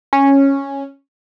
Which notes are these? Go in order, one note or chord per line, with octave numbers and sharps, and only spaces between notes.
C#4